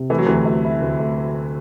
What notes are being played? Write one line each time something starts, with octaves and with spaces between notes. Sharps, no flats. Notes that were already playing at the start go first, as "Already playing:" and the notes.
Already playing: C3
E3 A3
F#3
D2 C3 E3
A3
E4
D2
A3